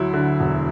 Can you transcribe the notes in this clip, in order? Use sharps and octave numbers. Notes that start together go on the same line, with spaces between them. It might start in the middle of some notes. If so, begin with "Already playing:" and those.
Already playing: D2 F#3 E4
D3
E1